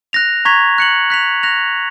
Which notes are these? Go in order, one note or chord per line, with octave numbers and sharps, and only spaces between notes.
F#6 A#6 F7
A#5 C#6 G#6 B6 F7
F#6 C#7 F#7
F#6 B6 F7
F#6 A#6 F7